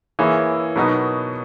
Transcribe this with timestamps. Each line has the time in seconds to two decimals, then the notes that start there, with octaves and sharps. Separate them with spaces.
0.19 E3 A#3 E4 G#4 C#5
0.76 B2 F#3 B3 D#4 A#4